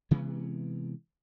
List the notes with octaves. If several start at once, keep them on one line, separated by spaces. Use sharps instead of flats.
C3 E3 G#3 B3